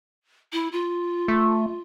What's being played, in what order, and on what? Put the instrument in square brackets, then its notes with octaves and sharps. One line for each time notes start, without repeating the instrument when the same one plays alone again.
[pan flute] E4
F4
[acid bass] A3